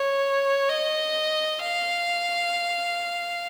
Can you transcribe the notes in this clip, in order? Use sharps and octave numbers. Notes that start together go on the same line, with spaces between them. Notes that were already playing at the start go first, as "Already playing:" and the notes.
Already playing: C#5
D#5
F5